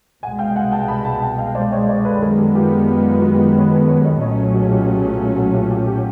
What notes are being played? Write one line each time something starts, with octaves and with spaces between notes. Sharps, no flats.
C2 B2 G#3 F#5 G#5
F5 G5
F#5 G#5
G5 A5
A5 B5
A5 B5
G5 A5
F5 G5
C5 D5
C#5 D#5
C5 D5
A4 B4
F#2 D#3 G#3 B3 G#4 A#4
G4 A4
F4 G4
F4
F#4
F4 G4
B4 C#5
A4 B4
B4 C#5
C#5 D#5
B1 A#2 F#3 A3 C#4 C#5 D#5
F#4 G#4
F4 G4
F#4
F4 G4
F4
F#4
F4 G4
F4 G4
F4 G4